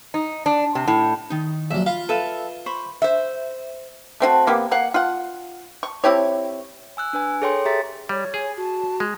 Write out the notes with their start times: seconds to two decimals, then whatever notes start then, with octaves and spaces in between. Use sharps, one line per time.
0.14 D#4
0.46 D4
0.75 C3
0.87 A2
1.30 D#3 D#4
1.71 A#1 F#3 E5
1.86 F4 F5 B5
2.09 A4 B4 E5 F5
2.66 C5 B5 C#6
3.02 C5 E5
4.20 A3 C4 F4 F#4
4.47 C3 A#3 B3 G4
4.71 A#3 F5 F#5
4.94 F4 F#5
5.83 C#6
6.04 C4 E4 G4 C#5
6.97 G#5 E6 F#6
7.13 D4 B4 G#5
7.42 G#4 A4 C#5 G5 C6
7.65 G4 G#4 E5 A#5 A6 B6
8.09 G3 C#5
8.34 G#4 G#5
8.57 F#4 A5
9.00 G#3